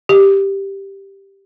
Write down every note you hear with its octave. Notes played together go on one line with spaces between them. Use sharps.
G4